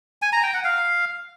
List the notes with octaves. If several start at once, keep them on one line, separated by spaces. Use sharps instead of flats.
G#5
A#5
G5
F#5
F5